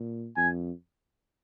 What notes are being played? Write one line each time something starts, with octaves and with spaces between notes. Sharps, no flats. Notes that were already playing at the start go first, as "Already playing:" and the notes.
Already playing: A#2
F2 G#5